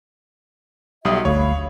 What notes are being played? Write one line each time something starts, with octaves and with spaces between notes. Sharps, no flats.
B1 G3 F#4 E5 D#6
G1 D2 C#5 F5 B5